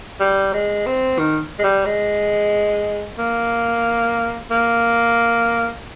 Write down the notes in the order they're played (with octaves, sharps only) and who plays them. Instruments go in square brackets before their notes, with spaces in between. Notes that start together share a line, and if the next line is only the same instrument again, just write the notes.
[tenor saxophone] G3
G#3
C4
D#3
G#3
G3
G#3
A#3
A#3